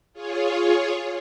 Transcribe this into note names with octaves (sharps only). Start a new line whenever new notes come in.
F4 G#4 C#5